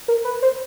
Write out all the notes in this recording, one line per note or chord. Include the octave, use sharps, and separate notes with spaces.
A#4
B4
C5